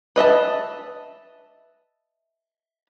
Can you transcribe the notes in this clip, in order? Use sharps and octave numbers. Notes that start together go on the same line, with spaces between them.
B4 D#5 E5 A5